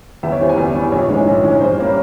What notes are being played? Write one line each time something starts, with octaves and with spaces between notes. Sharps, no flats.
E2 E5
C#5
E3 G3 C5
G#5
E2
E3 G3
A#1 C#5
G#2 E3 G#3 C#4
A#1
G#2 E3 G#3 C#4
G2 C5
G3 A#3 C#4